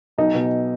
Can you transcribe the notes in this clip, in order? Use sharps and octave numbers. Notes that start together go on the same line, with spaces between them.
B1 D#4
B2